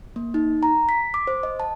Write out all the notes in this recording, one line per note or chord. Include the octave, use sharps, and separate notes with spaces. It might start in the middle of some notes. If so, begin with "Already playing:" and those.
A#3
D#4
A#5
B6
D6
C5
D#5
A5